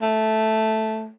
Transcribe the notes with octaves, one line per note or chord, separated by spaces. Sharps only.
A3